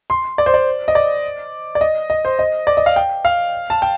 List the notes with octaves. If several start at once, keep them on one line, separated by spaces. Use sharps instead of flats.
C6
D5
C5
D5
D#5
D5
D5
D#5
D#5
C5
D#5
D5
D#5
F5
G5
F5
A5
G5